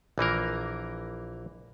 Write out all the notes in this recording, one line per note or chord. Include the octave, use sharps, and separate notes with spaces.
A#1 E3 A#3 A#4